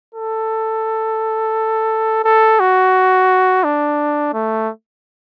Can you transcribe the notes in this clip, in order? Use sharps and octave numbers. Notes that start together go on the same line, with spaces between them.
A4
A4
F#4
D4
A3